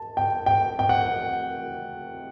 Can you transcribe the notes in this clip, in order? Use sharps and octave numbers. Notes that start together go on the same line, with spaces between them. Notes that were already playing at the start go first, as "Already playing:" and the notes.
Already playing: A5
G5
G5
G5
F#5